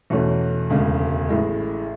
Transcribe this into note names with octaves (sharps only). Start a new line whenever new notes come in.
E2 B2 A3 C#4
E1 D2 C#3 G#3
A1 A2 G#3